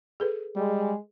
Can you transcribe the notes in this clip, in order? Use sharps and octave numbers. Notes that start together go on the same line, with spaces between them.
G#4 A4 B4
G3 G#3